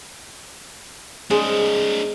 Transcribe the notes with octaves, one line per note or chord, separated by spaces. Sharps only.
G#3 C4 D4